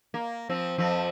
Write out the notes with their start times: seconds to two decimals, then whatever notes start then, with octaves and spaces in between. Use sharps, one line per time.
0.14 A#3
0.50 F3 C4
0.78 F2 F3 C4